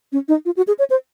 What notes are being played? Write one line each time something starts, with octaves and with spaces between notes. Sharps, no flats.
C#4
D#4
F4
F#4
G#4
C#5
C5